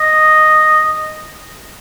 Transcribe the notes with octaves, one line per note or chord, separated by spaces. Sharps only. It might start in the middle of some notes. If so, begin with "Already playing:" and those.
Already playing: D#5